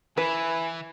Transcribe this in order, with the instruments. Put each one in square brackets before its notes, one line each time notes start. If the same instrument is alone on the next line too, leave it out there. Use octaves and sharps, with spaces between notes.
[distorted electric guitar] E3 [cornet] E4 [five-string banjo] B4 [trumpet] G#5